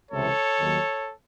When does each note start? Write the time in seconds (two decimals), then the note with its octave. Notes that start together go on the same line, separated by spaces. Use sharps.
0.11 C#2 C3 E3 A4 C#5
0.60 D#2 D#3 F#3